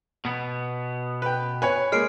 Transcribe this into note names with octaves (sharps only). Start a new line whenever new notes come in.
B2 B3
B4 G5
B4 C#5 G#5
G#3 A#3 F6 C7 D7